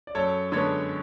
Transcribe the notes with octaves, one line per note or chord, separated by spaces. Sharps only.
D5
F#2 A4 C#5
D3 G#3 B3 A4 C#5